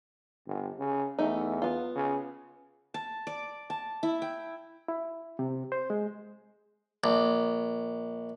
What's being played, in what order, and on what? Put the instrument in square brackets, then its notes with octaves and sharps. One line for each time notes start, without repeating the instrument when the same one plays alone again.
[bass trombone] G1
C#3
[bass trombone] E2 [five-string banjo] A3 D#4
[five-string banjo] B3 F4
[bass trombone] C#3
[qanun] A5
D5
A5
E4
G5
[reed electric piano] E4
C3
C5
G#3
[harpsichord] A#1